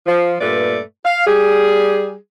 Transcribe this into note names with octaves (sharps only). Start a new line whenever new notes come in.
F3
G2 A#2 A3 B4 D5
F5
G3 G#4